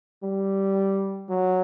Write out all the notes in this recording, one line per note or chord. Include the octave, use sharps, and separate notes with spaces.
G3
F#3